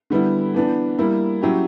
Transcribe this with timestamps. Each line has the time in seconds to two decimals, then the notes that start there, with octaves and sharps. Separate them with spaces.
0.10 D3 G3 B3 E4
0.54 E3 B3 D4
0.98 G3 A#3 E4
1.42 F#3 C#4 E4 G4